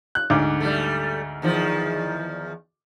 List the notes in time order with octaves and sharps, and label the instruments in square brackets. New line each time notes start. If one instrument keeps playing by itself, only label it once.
[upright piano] F#6
D2 G#2 D6
[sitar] G3 A3
E2 D#3 F3